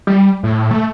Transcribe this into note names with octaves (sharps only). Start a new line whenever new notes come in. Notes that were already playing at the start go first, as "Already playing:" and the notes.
G3
A2
A3